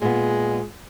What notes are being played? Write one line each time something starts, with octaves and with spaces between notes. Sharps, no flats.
A#2 G#3 B3